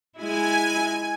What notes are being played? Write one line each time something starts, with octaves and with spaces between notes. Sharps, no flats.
G#3 E4 G#5